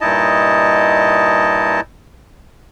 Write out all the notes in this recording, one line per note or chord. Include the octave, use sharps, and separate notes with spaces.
G2 A#2 D#4 E4 D#5 A5